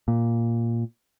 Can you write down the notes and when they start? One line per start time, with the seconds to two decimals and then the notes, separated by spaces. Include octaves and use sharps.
0.08 A#2